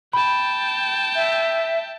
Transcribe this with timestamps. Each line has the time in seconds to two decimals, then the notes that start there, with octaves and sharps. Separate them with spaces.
0.13 G5 A5 B5
1.15 E5